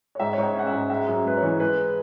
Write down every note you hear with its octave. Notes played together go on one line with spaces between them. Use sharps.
C#5
G#2 E5
G#2 C#5
E5
C#4 F#5
E5
G#2
G#3 E5
F#2
G#3 B4
C#5
E3
G#3 B4